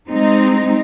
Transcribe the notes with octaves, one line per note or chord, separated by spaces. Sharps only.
G#3 C4 D#4